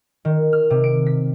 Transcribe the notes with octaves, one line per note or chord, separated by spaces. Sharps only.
D#3
F6
C3
D7
B6